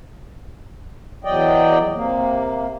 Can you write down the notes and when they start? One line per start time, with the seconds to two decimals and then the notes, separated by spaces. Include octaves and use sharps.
1.24 E2 F#3 D5 D#5 G5
1.94 C3 A#3